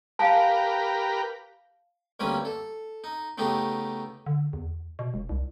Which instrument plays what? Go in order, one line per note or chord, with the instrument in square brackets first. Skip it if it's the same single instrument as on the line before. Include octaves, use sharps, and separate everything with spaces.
[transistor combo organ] G4 A#4 B4 [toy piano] F5 G#5 A5
[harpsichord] D2 G3 A#3 C4 C#4 B4
A4
D#4
C#3 A3 B3 D#4 G4
[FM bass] D3
E2
B2
E1
C2